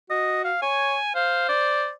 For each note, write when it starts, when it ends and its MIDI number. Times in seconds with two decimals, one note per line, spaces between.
0.10 0.52 66
0.10 0.41 75
0.44 0.60 77
0.62 0.96 73
0.62 1.12 80
1.15 1.90 72
1.15 1.46 77
1.49 1.90 74